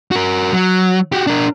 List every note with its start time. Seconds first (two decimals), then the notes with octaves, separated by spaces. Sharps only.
0.11 F#4 A#4
0.53 F#3
1.12 F#4 G4
1.27 D4 A#4